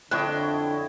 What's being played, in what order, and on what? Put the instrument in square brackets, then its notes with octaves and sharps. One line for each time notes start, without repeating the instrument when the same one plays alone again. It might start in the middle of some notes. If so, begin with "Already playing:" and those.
[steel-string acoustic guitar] F2 D4 G5 [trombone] D3 [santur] E4 C#5 D#5 [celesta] F#6